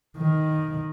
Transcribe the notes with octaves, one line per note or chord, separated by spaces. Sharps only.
D#3